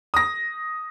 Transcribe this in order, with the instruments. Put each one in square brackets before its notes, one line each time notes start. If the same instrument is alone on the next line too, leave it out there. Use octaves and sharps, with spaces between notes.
[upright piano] D#6 A#6